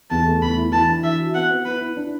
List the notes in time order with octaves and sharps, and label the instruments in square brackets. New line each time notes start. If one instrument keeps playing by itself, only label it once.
[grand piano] E2 [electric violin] A5
[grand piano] A3
[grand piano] E2 [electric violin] B5
[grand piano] E4
[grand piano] E3 [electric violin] A5
[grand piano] D4
[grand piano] E3 [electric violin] E5
[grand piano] F#4
[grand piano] B3 [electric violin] F#5
[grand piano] B3
[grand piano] E4 [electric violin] B4
[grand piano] E4
D4